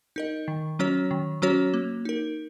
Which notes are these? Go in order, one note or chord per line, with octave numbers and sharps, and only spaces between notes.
D#4 A#4 D#5
D#3
F#3 C#4 F#4 C#5
D#3
F#3 C#4 F#4 C#5
A#3
D#4 A#4